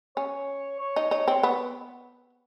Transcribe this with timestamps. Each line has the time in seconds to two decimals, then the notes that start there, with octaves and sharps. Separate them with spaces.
0.16 C#4 C#5
0.79 C#5
0.96 D#4
1.11 D#4
1.28 C4
1.43 B3